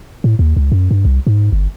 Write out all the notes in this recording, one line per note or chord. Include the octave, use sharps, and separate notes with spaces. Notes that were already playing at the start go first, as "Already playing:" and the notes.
A2
D#2
C#2
F#2
G2
C2
G#2
G1